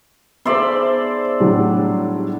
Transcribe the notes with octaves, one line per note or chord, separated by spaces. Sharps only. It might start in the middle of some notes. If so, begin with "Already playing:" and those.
B3 D#4 G#4 C5 D5 E5 B5 C6
A2 F#3 G3 D4